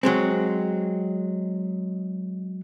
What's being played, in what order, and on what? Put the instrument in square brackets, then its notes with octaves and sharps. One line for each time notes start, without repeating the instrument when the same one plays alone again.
[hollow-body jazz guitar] F#3 G#3 C4